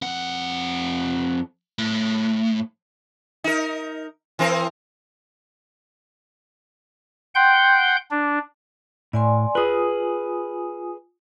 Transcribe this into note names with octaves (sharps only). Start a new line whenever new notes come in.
F2 F#5
A2
D#4 A#4
E3 C4 A#4
F#5 G5 C6 G6
D4
A2 D5 G#5 C6
F4 G#4 B4 G#5 D#6